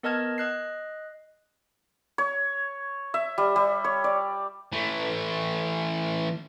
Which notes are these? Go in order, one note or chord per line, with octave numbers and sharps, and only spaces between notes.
B3 A#4 D#5 A5 F6 G#6
D#5 F#6 C7
C#5
E5
G3
G3
C#5
D5
E3 A3